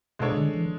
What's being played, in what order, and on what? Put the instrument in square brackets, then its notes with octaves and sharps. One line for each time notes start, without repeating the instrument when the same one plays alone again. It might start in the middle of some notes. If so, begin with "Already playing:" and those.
[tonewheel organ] B2 [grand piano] G#3 D4 A4 C#5
[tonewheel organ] D3
E3